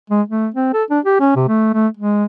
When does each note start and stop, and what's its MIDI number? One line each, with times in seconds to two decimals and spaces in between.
0.10 0.22 56
0.28 0.49 57
0.54 0.69 60
0.74 0.84 69
0.90 1.00 62
1.05 1.17 67
1.20 1.31 61
1.36 1.43 48
1.48 1.69 57
1.74 1.88 57
1.97 2.25 56